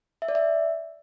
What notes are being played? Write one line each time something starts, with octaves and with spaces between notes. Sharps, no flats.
E5
D5
E5